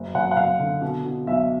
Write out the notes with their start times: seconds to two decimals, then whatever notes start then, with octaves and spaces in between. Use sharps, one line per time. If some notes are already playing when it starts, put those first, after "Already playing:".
Already playing: F#1
0.15 F#2 F#5
0.31 F#5
0.37 F#2 F5
0.60 D3
0.82 B2
1.05 B2
1.27 B1 E5